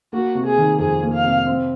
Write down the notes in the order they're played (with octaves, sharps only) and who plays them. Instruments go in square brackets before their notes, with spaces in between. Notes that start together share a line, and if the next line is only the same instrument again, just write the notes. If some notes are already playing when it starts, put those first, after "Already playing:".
[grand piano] A#3 [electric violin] F#4
[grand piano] C3
[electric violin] G#4
[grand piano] D#3
[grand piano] F2 [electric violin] G#4
[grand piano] A#3
[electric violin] F5
[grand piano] C3
C4